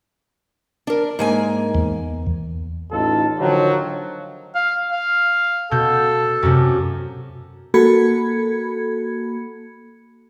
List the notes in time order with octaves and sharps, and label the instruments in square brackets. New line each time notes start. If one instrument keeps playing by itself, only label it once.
[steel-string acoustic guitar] D4 A#4
G#2 A#3 G#5
[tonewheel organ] E2
[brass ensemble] A1 D#4 F4 A4
D3 D#3 F3 F#3
[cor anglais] F5
F5
[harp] B2 G6 [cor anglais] A4
[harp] F#2 C3
[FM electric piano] A#3 F#4 A4 B5 G#6 C#7